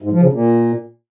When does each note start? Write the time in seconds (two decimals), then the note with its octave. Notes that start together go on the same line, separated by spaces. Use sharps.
0.02 G#2
0.12 F3
0.22 C#3
0.31 A#2